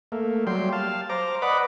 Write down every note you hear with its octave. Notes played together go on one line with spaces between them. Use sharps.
A3 A#3
F#3 G3 G5 C6
F5 A5
C5 A#5 D6
B4 D5 D#5 F#5 B5 D6